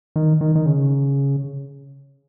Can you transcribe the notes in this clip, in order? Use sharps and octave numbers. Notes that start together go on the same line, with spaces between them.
D#3
D#3
D#3
C#3